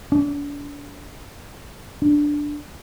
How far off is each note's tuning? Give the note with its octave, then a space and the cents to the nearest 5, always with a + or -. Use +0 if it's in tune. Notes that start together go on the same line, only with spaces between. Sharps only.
D4 -35
D4 +0